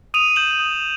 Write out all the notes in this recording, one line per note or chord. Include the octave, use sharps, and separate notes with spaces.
D#6 D#7 F7
G6 E7 F#7
D#6